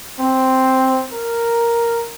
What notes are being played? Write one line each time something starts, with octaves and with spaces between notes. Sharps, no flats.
C4
A#4